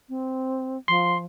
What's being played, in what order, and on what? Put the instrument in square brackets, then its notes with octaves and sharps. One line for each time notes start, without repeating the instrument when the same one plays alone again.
[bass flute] C4
[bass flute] F3 [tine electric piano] C6